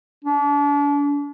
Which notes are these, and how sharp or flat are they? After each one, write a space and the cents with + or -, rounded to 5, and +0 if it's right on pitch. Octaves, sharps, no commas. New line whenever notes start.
D4 -35